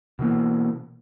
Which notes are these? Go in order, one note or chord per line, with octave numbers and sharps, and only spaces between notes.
B2 E3 A#3